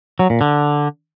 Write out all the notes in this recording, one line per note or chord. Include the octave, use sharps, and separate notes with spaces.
F#3
A#2
D3